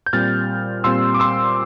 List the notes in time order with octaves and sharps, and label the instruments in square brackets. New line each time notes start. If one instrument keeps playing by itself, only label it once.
[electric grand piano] G6
A#2 G3 C4 F6 A6
A#2 G3 C4 C6 E6
D6
C6 E6